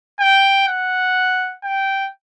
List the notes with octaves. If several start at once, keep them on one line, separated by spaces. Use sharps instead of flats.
G5
F#5
G5